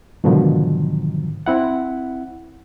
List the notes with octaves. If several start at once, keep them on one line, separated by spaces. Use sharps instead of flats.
G#2 B2 D3 D#3 F3 F#3
C4 E4 F#5